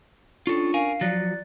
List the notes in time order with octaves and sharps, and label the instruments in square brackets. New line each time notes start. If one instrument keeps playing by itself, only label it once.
[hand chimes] C#4 D4 C#6 [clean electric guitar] F4 A4
[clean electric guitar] A#4 G#5 [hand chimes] F5 C7
[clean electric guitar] F3 F#3 [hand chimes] D5 F#6 A6